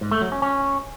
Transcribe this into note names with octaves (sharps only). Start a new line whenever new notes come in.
G#2
A3
F#3
C#4
C#4